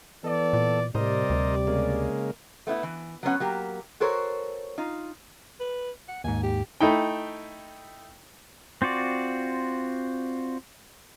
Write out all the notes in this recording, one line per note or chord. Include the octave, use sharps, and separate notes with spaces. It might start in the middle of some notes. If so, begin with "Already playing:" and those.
E3 B3 A4 D5
A#2
A2 C3 G3 A#4 C5 D5 D#5
D2
C#3 G#3 A#3
A3 B3 D#4 E4
E3
F#3 B3 C#4 F#5
F#3 A#3 G4
F#4 A4 A#4 C5 C#5
D#4 F4
B4
F#5
D#2 G#2 G#5
G4
A3 D#4 E4 G5
C4 F4 F#4 D5